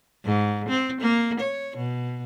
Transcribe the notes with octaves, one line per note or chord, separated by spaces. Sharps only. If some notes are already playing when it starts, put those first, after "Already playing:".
G#2
C4
A#3
C#5
B2